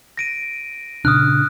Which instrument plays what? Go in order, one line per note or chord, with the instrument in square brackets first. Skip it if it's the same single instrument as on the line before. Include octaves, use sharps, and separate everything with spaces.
[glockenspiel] A#6 D7 D#7
[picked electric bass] A#2 C#3 D4 [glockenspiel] D#6 F6 F#6